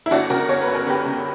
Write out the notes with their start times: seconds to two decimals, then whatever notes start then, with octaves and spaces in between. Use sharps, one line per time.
0.06 E4
0.11 G1 D4 F#4
0.30 C#3 F#4 A#4
0.49 G1 C#5
0.62 B4
0.67 F#2
0.75 A#4
0.87 G1 G4 B4
1.05 C#3